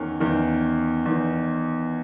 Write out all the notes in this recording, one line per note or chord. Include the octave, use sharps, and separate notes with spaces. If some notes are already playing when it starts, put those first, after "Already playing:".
Already playing: E2 D#3 C#4
E2 D#3
E2 D#3